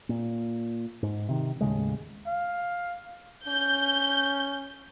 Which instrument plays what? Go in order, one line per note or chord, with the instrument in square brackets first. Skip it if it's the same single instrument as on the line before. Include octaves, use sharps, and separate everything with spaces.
[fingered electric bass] A#2
G#2
C3 D#3
D#2 A2 C#3 G#3
[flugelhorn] F5
[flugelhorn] C#4 [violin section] G6